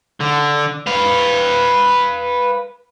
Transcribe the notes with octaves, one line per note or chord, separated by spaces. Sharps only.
D3
B4 F5